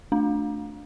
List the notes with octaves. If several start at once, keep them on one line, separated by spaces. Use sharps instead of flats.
A3 D4